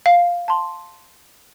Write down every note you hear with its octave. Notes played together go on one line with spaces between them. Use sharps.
F5
A5 C6